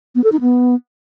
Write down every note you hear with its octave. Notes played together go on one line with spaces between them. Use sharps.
B3
A4
D#4
B3